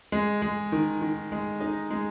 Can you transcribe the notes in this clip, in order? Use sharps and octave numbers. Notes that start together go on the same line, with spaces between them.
G#3
G#3
D#3
D#3
G#3
D#4
G#3